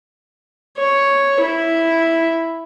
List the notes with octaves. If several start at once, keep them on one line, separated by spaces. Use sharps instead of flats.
C#5
E4